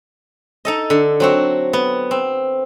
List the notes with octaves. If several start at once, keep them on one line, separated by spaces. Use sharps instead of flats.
D#4 A4 D#5
D3
F#3 C4 F#4
B3
C4